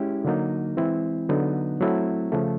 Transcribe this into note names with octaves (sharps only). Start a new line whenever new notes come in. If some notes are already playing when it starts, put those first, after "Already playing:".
Already playing: G#3 C#4 E4 G4
D3 F#3 A#3 D#4
E3 G#3 C4 E4
D3 F#3 B3 D#4
F#3 A3 C4 E4
C#3 F3 A3